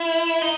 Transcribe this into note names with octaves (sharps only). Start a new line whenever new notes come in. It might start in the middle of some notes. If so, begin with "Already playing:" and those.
Already playing: E4
D#4